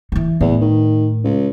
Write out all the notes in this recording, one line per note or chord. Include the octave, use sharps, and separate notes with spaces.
D#3 E3
E2 A2
D#3
C#2